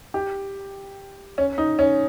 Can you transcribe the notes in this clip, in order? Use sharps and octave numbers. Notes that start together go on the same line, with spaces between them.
G4
C#4
D#4
C#4